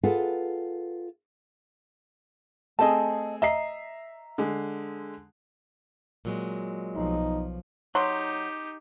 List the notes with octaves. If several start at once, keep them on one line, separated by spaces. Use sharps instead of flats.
F4 G#4 A4 B4 F5 F#5
A3 C4 G#4 D#5 A5
D#5 E5 A#5 C7
D3 G#3
A#2 F#3 G#3
B1 F3 D#4
F#3 D#4 G4 C6